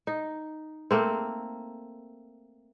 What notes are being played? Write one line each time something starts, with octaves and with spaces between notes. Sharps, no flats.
D#4
A3 A#3 C4